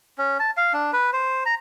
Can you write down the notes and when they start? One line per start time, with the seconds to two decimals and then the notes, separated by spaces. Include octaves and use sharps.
0.18 C#4
0.40 A5
0.57 F5
0.73 D4
0.93 B4
1.13 C5
1.46 A#5